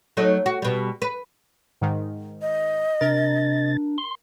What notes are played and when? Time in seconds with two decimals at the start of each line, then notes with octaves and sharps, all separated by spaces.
0.17 F#3 A3 D#4
0.46 F#4
0.62 B2 G3
1.02 B4
1.81 G#2 D#3
2.42 D#5
3.01 C3 D4 A#4 A6
3.98 C6